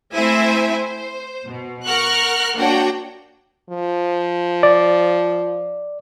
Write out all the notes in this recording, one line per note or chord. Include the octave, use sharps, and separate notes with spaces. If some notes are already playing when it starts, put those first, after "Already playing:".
A3 C4 E4 C5 E5 G#5
C5
B2
A#4 F#5 C#6 F6 F#6
A#3 D4 F#4 C#5 F#5 G5
F3
D5